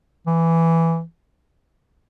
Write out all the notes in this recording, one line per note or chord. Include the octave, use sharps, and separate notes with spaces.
E3